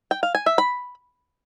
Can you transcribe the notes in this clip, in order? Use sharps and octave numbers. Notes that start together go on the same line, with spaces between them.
G5
F5
G#5
E5
B5